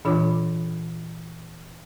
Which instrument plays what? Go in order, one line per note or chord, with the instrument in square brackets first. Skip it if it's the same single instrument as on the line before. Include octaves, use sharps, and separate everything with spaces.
[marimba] A#2 E3 D4 F4 C#5 D6